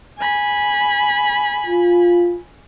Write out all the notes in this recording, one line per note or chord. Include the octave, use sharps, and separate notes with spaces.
G#5 B5
F4